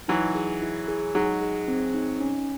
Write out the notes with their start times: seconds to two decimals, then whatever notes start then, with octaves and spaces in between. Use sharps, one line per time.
0.08 E3 F#3 D#4
0.35 G#4
0.62 E4
0.88 G#4
1.15 F#3 G#3 D#4
1.41 G#4
1.68 C4
1.94 D#4
2.20 C#4